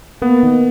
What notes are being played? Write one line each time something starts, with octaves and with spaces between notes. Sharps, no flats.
A#3 B3
D#3